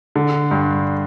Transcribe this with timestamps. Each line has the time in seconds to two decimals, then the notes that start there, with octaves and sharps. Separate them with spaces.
0.15 D3
0.51 G2